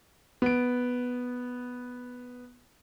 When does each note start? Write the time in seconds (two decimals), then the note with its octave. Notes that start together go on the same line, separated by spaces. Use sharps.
0.42 B3 D7